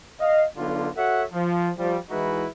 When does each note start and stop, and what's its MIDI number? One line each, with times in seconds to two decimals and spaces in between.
0.20 0.43 75
0.20 0.43 77
0.57 0.89 35
0.57 0.89 50
0.57 0.89 65
0.96 1.22 66
0.96 1.22 69
0.96 1.22 73
0.96 1.22 76
0.96 1.22 78
1.33 1.70 53
1.77 1.97 53
1.77 1.97 55
2.10 2.45 52
2.10 2.45 56
2.10 2.45 63
2.10 2.45 64
2.10 2.45 66
2.10 2.45 71